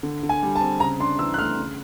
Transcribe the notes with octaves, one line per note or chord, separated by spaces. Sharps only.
D3
D3
G#5
G3
A5
C4
C#3 A#5
D4 C6
E3 E6
F#6
A3 F6
C#3